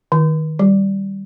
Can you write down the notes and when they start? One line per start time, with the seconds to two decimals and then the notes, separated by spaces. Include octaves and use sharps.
0.12 D#3
0.59 G3